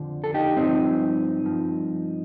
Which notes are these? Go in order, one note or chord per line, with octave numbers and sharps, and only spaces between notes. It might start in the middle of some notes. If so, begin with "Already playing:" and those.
Already playing: F2 D3 F3
A4
D#4 G4
G2 F3 C4 D#4
G2 F3